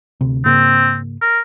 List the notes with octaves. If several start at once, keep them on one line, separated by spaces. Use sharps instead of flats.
D2 C3
G#2 C#3 A#3 C4
A#4